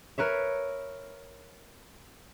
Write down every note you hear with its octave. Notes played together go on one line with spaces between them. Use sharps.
A#4 B4 C#5 E5